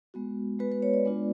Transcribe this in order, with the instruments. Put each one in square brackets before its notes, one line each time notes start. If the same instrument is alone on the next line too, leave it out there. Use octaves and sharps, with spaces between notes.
[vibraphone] G#3 B3 F#4
G#3 B3 F#4 B4
B4
C#5
D5
G#3 B3 D4 F4